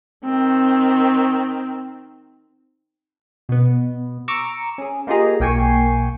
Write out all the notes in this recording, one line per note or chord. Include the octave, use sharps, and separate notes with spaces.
D#3 C4
B2 B3
A#5 C#6 D6 E6
C#4 G#4
A#3 D#4 F4 G4 G#4 A#5
B1 A#3 G5 G#5 C#6 C7